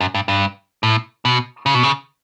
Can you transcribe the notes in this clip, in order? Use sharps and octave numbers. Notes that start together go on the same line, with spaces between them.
F#2
G2
G2
A2
B2
C#3
B2
C#3